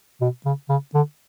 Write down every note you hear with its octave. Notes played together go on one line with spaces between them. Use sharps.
B2
C#3
C#3
D3